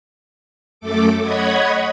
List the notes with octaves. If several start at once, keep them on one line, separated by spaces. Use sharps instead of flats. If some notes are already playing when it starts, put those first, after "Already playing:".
F#2 A3 A4 D6
C#5 D#5 F#5 B5 G#6